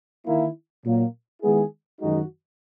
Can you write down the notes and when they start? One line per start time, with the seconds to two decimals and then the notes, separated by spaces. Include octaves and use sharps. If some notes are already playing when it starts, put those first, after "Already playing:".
0.26 D#3 A#3 E4
0.84 A#2 F#3 A#3
1.42 D#3 G#3 B3 E4 G#4
2.01 F#2 D#3 G#3 D#4 F#4